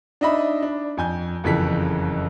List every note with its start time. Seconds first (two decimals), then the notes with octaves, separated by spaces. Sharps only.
0.21 D4 D#4 D#5 E5 B5
0.62 D4
0.97 F2 G#5 G6
1.44 F#1 F2 C#3 E3 A4 B6